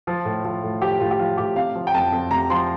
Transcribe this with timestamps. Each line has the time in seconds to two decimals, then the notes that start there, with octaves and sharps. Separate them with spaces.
0.07 F3 F4
0.25 A2
0.45 F3
0.63 A2
0.82 F3 G4
1.00 A2 F4
1.11 G4
1.19 F3 F4
1.38 A2 G4
1.56 C3 F5
1.75 F3
1.87 G5
1.94 F2 A5
2.12 F2
2.31 C3 A#5
2.50 F3 C6